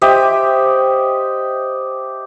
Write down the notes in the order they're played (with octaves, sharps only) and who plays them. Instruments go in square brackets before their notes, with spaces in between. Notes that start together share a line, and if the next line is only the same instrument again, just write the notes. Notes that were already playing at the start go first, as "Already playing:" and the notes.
[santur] G4 C5 D#5 E5